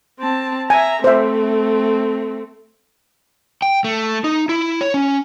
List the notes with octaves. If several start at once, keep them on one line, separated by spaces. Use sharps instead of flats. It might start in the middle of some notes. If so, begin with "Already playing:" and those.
C4 A5
E5 G#5 A#5
A3 C4 C5 E5
G5
A3
D#4
E4
C#5
C#4